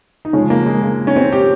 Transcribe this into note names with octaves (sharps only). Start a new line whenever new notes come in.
D#4
C#3 F3 G#3 C#4
A#3
G#3
A#3
C#4
C4
G4